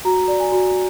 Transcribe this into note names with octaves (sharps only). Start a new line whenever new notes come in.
F#4 A#5
D5
G#5
F#4